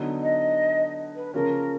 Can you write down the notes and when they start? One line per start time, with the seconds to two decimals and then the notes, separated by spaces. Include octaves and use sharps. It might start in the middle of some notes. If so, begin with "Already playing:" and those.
Already playing: D3 F#3 B3 D#4
0.23 D#5
1.15 B4
1.34 C#3 F3 A#3 C#4 A#4